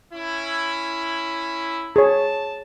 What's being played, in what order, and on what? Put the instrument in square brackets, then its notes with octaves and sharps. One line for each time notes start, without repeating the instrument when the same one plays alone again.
[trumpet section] C#4 E4
[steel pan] G#4 C#5 [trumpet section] A5